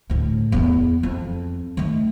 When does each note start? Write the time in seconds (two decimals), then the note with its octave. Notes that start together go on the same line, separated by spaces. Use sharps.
0.10 D2 A2
0.52 E2 E4
1.03 F2
1.77 D#3 A3